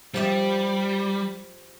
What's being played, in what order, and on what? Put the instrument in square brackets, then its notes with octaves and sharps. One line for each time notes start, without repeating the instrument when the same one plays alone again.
[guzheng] F3 G4 E5 [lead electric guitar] G3